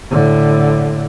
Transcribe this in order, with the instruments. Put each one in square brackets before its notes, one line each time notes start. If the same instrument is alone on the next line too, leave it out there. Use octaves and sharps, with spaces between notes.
[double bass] A2 D3